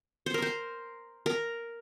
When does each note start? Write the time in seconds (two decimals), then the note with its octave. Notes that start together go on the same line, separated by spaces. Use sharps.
0.26 C5
0.34 A#4
0.42 C5
1.26 A#4